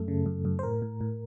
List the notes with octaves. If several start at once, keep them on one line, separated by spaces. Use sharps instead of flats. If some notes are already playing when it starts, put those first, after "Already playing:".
Already playing: F#2 A3 A4
C#3
F#2
F#2
C5
A2 A#4
A2
A2